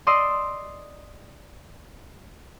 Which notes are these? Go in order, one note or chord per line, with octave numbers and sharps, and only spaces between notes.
D5 D#5 C6 D#6 E6